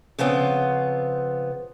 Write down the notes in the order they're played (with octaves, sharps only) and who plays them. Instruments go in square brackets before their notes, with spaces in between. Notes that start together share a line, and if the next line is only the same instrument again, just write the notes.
[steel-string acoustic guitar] C#3 F3 B3 C4